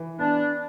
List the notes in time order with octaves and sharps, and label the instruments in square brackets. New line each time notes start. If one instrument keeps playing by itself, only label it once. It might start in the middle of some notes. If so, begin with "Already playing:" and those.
Already playing: [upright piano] E3
[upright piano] B3 [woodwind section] D4